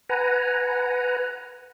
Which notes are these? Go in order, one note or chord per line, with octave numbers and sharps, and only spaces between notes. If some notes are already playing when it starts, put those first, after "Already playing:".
B4 F#5 G#5 A#5